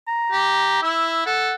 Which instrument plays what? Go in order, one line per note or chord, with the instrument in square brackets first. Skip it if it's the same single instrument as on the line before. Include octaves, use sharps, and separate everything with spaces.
[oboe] A#5
[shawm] G4
[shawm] E4 [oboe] E6
[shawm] A4 [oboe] F#5